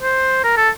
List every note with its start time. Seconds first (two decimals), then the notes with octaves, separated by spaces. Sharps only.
0.02 C5
0.44 A#4
0.57 A4